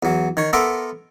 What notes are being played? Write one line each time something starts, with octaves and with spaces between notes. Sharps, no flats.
E2 F#3
D#3 C#5
B3 A4 A#4 E5 C6 D6